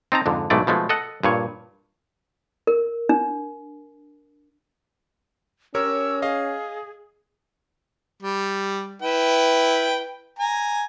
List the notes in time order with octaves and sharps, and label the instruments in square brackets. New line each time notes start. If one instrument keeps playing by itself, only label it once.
[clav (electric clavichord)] C4 D#4 A5 A#5
F2 G#2 D3
B1 G#2 E3 A3 D5
B2 F3 G#3 A3
A4 D#5 F#5
G2 A#2 C#5
[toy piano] A#4
D4
[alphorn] C#4 [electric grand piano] G4 A#4 C#5 [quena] E6
[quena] G#4 [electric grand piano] D#5 F5
[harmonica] G3
E4 B4 G5
G#5 A#5